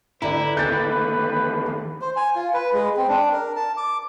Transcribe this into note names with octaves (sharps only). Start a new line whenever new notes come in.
D3 E4 G4 B4 D5 A#5
E2 D#3 G4 G6 A6
C5
G#5
F4
B4
G#3
C4
D4
A#4
A5
D6